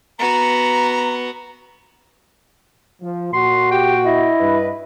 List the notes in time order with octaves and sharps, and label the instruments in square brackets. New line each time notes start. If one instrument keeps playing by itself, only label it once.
[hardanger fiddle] B3 F#4 [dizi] A#5
[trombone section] F3
[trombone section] A#2 F#4 [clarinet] C6
[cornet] G4 [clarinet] G5
[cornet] E4 [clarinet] D#5
[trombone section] G2 B4